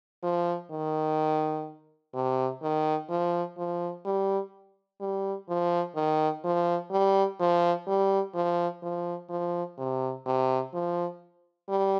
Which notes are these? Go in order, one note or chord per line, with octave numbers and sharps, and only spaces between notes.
F3
D#3
C3
D#3
F3
F3
G3
G3
F3
D#3
F3
G3
F3
G3
F3
F3
F3
C3
C3
F3
G3